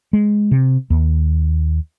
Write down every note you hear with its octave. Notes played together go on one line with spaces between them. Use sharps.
G#3
C3
D#2